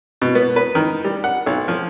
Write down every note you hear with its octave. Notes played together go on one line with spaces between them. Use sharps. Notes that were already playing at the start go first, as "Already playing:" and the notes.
B2
B3
B4
D#3
G3
F#5
B1
F3